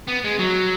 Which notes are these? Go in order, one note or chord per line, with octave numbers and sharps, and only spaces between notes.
B3
G#3
F#3